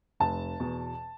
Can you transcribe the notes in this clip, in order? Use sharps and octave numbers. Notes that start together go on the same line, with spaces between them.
F1 A5
E2 B2